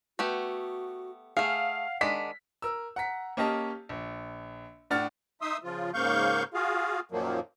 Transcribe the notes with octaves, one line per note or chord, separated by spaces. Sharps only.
A3 B3 F#4 G4
A3 G#4 F5 F#5
D#3 G#3 D4 B6
A#4 E6
F#5 A#5 B6
A#3 C#4 G4 D#5 A5
A#1
A2 D4 F#5 F6 A6
D#4 E5 C6 D#6 E6
C#3 F3 F4
G#2 C#3 A#3 F5 C#6 G6
F4 F#4 G#4 F5
F#2 A#2 D#3 F3 F#3 A#3